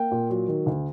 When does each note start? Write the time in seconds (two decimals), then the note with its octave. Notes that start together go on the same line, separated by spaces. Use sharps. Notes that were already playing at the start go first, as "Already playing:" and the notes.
Already playing: A#3 G5
0.11 A#2
0.30 F#3
0.48 D#3
0.66 D2